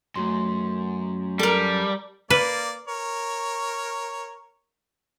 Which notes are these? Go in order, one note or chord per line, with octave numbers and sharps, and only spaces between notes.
F#2 A3 F#4 C6
G3 A4 A#4
A#3 B4 D5
A#4 C#5